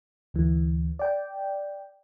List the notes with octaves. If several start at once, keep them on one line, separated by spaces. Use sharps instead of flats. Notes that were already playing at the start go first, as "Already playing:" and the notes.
D2 E3
D5 G5